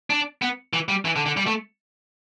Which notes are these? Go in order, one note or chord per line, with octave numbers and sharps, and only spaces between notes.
D4
B3
E3
G3
E3
D3
D3
G3
A3